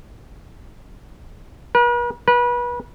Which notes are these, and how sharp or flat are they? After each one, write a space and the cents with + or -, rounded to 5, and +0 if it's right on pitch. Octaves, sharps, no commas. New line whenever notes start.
B4 -45
B4 -30